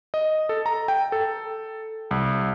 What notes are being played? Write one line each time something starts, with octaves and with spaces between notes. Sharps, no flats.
D#5
A4
A#5
G5
A4
C2